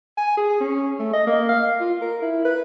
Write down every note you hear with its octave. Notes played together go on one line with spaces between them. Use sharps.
G#5
G#4
C#4
A3
D#5
A#3
F5
F4
A#4
E4
B4